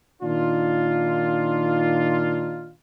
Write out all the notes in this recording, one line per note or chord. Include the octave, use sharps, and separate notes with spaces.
A#2 D#3 D4 D#4 F4